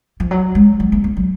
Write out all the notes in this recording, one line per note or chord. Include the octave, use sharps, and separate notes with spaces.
F3
F#3
G#3
F#3
A#3
A#3
F#3